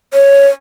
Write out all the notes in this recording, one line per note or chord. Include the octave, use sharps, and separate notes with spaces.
C#5